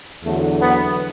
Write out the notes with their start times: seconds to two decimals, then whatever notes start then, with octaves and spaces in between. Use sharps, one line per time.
0.24 E2 D3 F#3 A3
0.60 B3